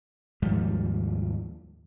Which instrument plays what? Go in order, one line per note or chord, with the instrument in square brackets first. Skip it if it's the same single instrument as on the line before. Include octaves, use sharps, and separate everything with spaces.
[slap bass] D#2 G#2 F3 G3